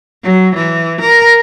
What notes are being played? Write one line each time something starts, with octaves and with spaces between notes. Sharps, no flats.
F#3
E3
A#4